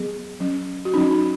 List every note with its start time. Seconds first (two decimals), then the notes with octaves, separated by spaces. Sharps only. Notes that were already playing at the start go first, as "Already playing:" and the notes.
Already playing: F#3 B3 G#4
0.40 F#3 C#4
0.85 F#4
0.94 F#3 C#4 D#4
1.11 D#4